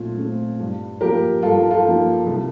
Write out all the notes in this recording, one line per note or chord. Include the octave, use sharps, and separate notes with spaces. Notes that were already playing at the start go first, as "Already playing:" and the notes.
Already playing: A#2 A3 C4
A3 C4
G2
F3 A#3 G4 A#4
G2 F4 A4
F4 A4
F3 A#3
C2